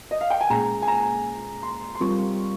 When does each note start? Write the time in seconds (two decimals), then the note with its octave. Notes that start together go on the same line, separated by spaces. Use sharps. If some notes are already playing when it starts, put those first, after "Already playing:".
0.11 D#5
0.21 F5
0.30 G5
0.41 G#5
0.50 A#2 G#3 C#4 G#4 A#5
0.82 G#5
0.88 A#5
1.63 C6
1.95 C6
2.01 G3 C4 F4 A#4 C#6